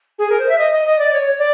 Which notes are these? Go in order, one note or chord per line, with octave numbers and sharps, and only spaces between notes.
G#4
A#4
C5
E5
D#5
D#5
D#5
D5
C#5
D5